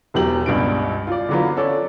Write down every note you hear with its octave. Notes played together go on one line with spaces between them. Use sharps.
E1 E2 F#3 G4 F#7
C#2 G2 B2 D4 D7
F4 D5
D3 E3 F#3 B3 F4
C#4 A4 D5